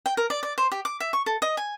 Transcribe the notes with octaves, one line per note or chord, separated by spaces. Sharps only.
G5
A#4
D5
D5
C5
G4
D6
E5
C#6
A4
D#5
G#5